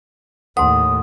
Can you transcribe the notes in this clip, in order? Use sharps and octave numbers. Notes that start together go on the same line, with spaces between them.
D#2 A2 F#5 A5 C6 D#6